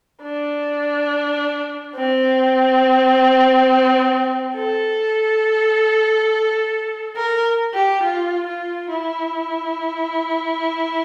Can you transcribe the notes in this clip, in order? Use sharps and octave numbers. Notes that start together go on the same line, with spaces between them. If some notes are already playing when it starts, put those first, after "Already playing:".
D4
C4
A4
A#4
G4
F4
F4
E4